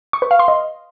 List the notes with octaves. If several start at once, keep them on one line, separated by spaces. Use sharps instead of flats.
C#6
B4
F5
C6
D#5